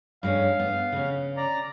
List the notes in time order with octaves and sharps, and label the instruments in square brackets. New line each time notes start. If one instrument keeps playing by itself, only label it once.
[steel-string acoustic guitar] G2 G#3 C#4 [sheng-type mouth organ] F5
[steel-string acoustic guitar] B3
C#3 C#4
[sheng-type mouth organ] D5 A#5